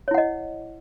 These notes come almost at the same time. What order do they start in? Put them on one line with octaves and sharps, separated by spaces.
C#5 E4 F#5 D#5